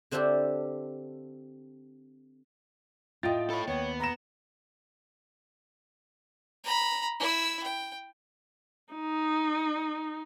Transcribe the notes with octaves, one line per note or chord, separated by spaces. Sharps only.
D3 C4 D4 E4 G4 A4
A2 F4 D#5 G5 A6
A4 C#5 B5
D#2 B3 C#5
A#5 B5 E7
A#5 B5
E4 E6
G5
D#4